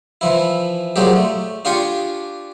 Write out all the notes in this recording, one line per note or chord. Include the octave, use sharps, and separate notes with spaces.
E3 F3 E4
A#2 F#3 G#3 C4 G4
A3
D4 F4 G4 G#5 C6 C#6